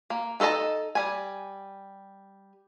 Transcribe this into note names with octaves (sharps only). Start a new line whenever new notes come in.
A#3
D#4 A4 A#4 D#5 A5
G3 G#5